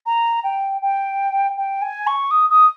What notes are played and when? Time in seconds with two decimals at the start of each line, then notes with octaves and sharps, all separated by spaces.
0.06 A#5
0.44 G5
0.82 G5
1.57 G5
1.82 G#5
2.07 C#6
2.31 D#6
2.50 D#6